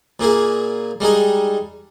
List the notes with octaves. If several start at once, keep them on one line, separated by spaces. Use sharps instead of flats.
A#2 A#3 E4 G#4
G3 G#3 D#4 G#4